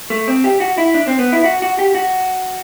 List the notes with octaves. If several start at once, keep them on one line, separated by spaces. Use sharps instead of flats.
A3
C4
G4
F#4
E4
D4
C4
B3
E4
F#4
F#4
G4
F#4